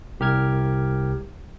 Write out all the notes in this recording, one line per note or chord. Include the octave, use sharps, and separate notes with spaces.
C2 G4 A#4 F6 G#6